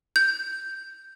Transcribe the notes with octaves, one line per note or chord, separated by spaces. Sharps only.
G6